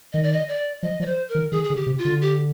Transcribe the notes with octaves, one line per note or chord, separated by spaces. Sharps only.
D#3 D#5
D5
D#5
D5
F3 D#5
F3 D5
C5
A#4
D#3
D#3 G#4
G#4
D3
G4
C3
F4
D3
G4